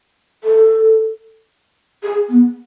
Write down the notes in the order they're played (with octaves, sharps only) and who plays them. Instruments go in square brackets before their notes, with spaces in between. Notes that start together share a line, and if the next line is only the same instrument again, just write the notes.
[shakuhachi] A4
G#4
B3